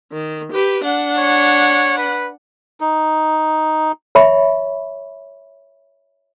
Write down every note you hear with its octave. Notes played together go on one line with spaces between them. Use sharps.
D#3
G4 B4
D4 F#5
C#5
B4
D#4
C#5 E5 B5 C#6